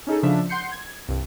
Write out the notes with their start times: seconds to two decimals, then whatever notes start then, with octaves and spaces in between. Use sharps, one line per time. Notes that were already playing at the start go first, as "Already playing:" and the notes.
0.07 C#4 D#4 G#4 A4
0.23 C#3 F3 D4 E5
0.49 F#5 C6 G6 C7 C#7
0.72 G#6
1.08 C2 G2